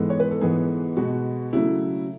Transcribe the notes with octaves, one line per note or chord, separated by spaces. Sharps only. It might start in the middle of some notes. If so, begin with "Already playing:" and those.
Already playing: G#2 E3 G#3 B3 A4
C#5
B4
A4
G#2 E3 G#3 B3 G#4
B2 G#3 B3 F#4
C#3 F#3 A3 E4